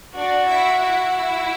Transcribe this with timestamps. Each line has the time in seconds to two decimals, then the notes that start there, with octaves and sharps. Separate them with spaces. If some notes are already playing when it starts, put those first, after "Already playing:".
0.15 D4 F#4 D5
0.47 E4 E5
0.80 E4 E5